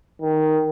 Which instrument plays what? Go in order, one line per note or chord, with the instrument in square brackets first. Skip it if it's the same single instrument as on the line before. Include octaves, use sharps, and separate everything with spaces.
[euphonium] D#3